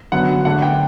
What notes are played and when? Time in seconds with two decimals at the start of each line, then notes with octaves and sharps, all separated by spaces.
0.12 F#2 D3 F#3 B3 F#5
0.45 D3 A3 D4 F#5
0.62 G5